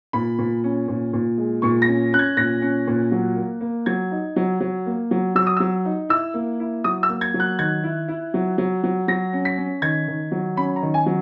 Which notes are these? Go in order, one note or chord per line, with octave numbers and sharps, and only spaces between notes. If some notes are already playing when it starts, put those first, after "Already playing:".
A#2 B5
A#2
C#4
A#2
A#2
G#3
A#2 C#6
A#6
C#4
C#4 F#6
G#6
A#2 A#6
C#4
A#2
F#3
A#3
A#3
F#3 G#6
D#4
F#3
F#3
A#3
F#3
F#3 E6
D#6
F#3 E6
D#4
E4 E6
A#3
E4
F#3 D#6
E6
A#3
G#6
F#3
F#6
D#3 G#6
E4
E4
F#3
F#3
F#3
F#3 A#6
C#4
B6
C#4
D#3 G#6
D#3
F#3
C#4 B5
A#5
D#3
G#5
F#3